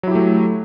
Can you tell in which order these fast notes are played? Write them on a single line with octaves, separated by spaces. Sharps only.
F#3 E4 G4 A3